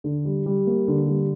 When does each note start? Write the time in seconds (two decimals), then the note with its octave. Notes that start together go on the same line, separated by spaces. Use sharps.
0.04 D3
0.25 G3
0.46 G3
0.67 A#3
0.88 D3
1.08 G3